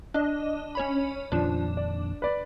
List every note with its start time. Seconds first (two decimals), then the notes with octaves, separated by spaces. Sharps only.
0.14 D4 D#5
0.75 C#4 C#5 B5
1.32 F2 A#2 D#3 F3 D4
1.77 D5
2.22 B4 D5